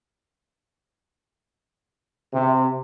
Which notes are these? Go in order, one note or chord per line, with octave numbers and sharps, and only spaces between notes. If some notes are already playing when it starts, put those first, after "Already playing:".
C3